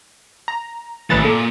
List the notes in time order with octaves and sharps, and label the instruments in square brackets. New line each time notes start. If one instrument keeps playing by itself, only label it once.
[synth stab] A#5
[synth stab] A1 B4 A6 [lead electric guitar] D#2 E3
[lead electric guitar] A#2 [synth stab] A4